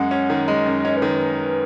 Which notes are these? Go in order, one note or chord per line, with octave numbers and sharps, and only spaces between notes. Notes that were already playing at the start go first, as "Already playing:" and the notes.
Already playing: F#2 G#3 F#5
C#4
D#3
G#3 D#5
F#2
D#5
C#4
B4
D#3